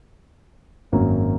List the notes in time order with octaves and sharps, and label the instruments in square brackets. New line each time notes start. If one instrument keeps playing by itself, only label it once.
[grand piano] G#1 F#2 F#3 A#3